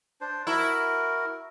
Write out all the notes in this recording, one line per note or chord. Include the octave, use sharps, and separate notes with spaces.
D4 C5
E4 F#4 A#4